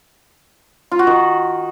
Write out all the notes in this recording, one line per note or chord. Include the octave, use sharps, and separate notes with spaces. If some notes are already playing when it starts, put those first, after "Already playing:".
F4
F#4
D#3